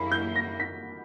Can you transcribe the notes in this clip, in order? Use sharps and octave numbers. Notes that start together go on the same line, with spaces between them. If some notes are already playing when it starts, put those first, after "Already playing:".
Already playing: F#2 C#3 F#3 A#3 E4 A#5 B5
G6
A#6
B6